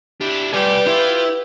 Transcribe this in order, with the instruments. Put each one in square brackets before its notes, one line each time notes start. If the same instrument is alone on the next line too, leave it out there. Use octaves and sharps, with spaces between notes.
[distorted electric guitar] D4 E4 [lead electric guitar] G4
[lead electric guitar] G3 D5 [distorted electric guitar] F4 G#5 [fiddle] G4 [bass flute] B4
[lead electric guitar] E4 [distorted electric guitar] F4